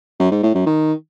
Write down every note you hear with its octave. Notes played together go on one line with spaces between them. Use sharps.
F#2
G#2
A2
F#2
D#3